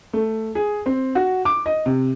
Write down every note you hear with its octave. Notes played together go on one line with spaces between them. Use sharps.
A3
G#4
C4
F#4
D6
D#5
C3